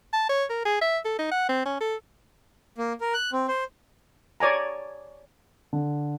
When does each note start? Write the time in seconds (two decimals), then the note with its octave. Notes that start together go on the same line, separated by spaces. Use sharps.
0.13 A5
0.29 C#5
0.49 A#4
0.65 G#4
0.81 E5
1.05 A4
1.19 D#4
1.31 F#5
1.49 C4
1.65 C#4
1.80 A4
2.78 A#3
3.01 A#4
3.14 F#6
3.33 C4
3.48 C5
4.40 C#5 D5 G#5 A#5
5.73 D3